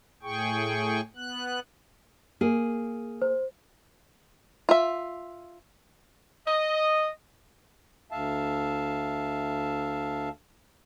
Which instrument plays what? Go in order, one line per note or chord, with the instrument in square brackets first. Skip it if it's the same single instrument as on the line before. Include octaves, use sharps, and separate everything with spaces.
[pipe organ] A2 G#4 G5 C#6
B3 F#6
[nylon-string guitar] A#3 G#4
[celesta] C5
[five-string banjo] F4 E5
[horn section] D#5
[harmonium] D2 E5 F5 A5